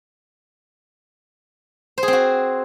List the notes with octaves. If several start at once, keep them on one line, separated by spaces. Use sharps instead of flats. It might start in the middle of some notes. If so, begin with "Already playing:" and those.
C5
G#4
C4
F#4